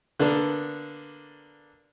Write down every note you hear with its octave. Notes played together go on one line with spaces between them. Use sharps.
D3 A#3 B3 D4